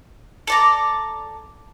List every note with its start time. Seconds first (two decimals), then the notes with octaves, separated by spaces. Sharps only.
0.47 A4 D5 A#5